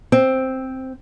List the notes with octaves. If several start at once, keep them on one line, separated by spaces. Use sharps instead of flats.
C4